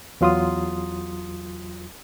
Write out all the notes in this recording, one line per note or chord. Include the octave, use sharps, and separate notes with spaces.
E2 F#3 F4 C6 D#6